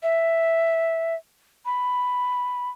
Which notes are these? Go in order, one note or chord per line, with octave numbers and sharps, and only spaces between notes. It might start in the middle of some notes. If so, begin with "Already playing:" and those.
E5
B5